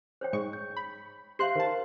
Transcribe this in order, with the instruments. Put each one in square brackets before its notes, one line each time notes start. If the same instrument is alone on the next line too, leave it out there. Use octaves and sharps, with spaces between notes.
[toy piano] C5 C#5 G5
[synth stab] G#2 G#3 C#6
[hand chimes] G6
[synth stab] B5
[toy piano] G4 E5 [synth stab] C5 C6 F#6 [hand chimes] F5 C7
[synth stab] D#3 A5 [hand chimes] A#4 C5